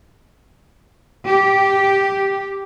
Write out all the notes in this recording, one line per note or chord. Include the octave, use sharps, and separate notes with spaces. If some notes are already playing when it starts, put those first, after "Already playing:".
G4